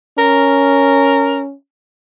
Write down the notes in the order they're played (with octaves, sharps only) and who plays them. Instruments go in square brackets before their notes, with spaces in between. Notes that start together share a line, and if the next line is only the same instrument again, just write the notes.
[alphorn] C#4 [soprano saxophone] A#4